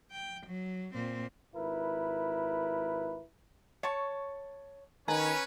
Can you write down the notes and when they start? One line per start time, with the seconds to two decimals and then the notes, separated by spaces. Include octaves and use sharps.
0.12 G5
0.47 F#3
0.94 A#2 C4
1.55 G#1 E4 A#4 B4
3.83 C#5 A5 C#6
5.08 D#3 C#4 B4 G#5 A#5